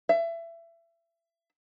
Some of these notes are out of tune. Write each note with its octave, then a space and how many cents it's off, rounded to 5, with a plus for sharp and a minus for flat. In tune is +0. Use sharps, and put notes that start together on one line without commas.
E5 +25